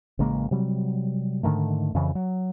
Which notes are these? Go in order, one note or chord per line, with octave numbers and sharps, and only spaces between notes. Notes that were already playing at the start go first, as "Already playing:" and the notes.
A1 C#3 G#3 A#3
C3 F#3 G3
G#2 D3 D#3 A3
F2 C#3 E3
F#3